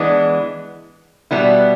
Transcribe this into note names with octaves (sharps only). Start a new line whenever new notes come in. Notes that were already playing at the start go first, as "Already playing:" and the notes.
Already playing: E3 G#3 B3 D4
B2 G3 B3 E4